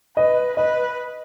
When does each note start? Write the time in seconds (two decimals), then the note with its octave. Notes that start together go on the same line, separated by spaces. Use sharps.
0.17 B4 D#5
0.57 B4 D#5